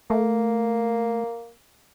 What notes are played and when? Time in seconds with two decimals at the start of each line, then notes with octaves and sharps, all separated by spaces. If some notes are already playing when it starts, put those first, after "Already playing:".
0.10 A3 A#3